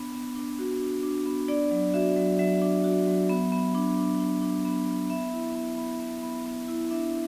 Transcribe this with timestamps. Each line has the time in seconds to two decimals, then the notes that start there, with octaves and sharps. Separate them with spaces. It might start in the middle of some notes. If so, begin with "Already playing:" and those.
Already playing: B3 D4
0.13 B3
0.36 D4
0.59 F#4
0.81 D4
1.03 D4
1.26 B3
1.48 D4 D5
1.71 F#3
1.94 F#4 E5
2.16 F#3
2.39 F#3 E5
2.62 D4
2.84 F#4
3.07 F#3
3.30 B3
3.52 B3
3.75 D4
3.98 D4
4.20 D4
4.42 D4
4.65 B3
4.88 B3
5.10 B3 E5
5.32 E4
5.55 B3
5.78 B3
6.00 B3
6.23 B3
6.46 B3
6.68 E4
6.91 D4 E5